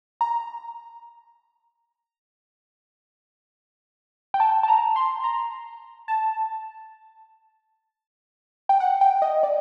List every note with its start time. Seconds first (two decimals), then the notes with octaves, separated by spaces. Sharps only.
0.21 A#5
4.34 G5
4.40 A5
4.63 A5
4.68 A#5
4.96 C6
5.24 A#5
6.08 A5
8.69 G5
8.80 F#5
9.01 G5
9.22 D#5
9.43 D5